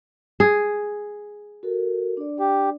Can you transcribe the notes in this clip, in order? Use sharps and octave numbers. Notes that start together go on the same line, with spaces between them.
G#4
F#4 A4 A#4
D4 D5
G4